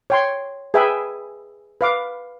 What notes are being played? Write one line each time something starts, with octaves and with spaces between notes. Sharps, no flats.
C#5 G5 C6
G#4 B4 E5 G5 G#5 B5
B4 F5 D6